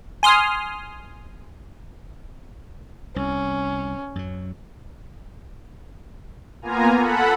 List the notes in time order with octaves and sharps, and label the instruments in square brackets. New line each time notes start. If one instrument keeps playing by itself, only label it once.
[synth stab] G#5 C6 D#6 F6
[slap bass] C2 [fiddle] C#4
[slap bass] F#2 F#3
[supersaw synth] A#3 B3 F4 G#5 A#5
A4 F#5 B5